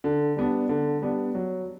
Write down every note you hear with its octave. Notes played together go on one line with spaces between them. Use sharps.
D3
G3 B3 D4
D3
G3 B3 D4
F#3